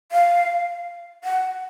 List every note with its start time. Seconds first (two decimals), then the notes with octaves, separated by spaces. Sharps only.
0.12 F5
1.24 F#5